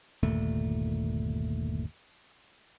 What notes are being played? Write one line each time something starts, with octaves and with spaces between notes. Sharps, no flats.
G1 D#2 A#2 A3